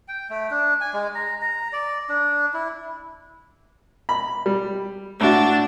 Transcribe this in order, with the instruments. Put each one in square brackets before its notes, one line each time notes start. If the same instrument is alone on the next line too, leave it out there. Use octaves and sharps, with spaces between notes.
[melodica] G5
A3
D4
G#5
G#3
A#5
A#5
D5
D4
E4
[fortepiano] B5
G3
[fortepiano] A2 F#4 [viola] D4